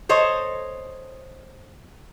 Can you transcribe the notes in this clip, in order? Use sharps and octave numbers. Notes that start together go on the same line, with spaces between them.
A4 C5 C#5 D#5